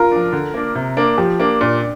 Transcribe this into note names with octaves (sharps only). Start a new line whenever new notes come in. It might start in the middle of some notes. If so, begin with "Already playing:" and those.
Already playing: F4 A#4
F3 D4
D3
A#3 D4
C3
A#3 D4
F3 G4
A#3 D4
A#2 D4